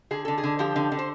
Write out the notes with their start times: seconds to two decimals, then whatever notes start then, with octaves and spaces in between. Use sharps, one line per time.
0.11 D3 G#4
0.25 D3 A4
0.38 G#4
0.43 D3
0.59 F3 G4
0.76 D3
0.92 D3
0.99 C5